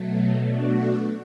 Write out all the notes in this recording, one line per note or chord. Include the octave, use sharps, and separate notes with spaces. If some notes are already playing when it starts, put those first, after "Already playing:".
Already playing: B2 F#3 A3
B2 A3 D4 F#4